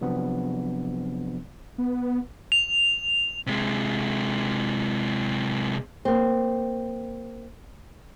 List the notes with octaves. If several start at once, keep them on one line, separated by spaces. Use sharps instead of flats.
C3 F3 F#3 B3 C4 D4
B3
F7
C3 G#3
A#3 C4